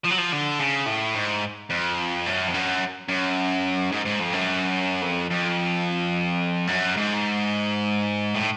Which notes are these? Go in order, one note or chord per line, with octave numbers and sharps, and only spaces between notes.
F3
F#3
F3
D3
C#3
A2
G#2
F2
F#2
F2
F#2
F#2
G#2
G#2
F2
F#2
F2
F2
F#2
G#2
A2